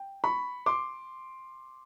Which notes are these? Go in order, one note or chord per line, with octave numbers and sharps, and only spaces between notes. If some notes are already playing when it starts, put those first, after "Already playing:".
Already playing: G5
B5 C#6
C6 D6